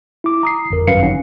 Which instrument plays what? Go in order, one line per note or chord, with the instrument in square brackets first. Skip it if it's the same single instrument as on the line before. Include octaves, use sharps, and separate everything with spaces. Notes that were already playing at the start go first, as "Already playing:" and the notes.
[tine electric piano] E4 D6
A#5 D#6 C7
G1 F2 A#4
G#1 F#2 B4 F5 C7 C#7
G1 F#3 C#4 D#4 F#5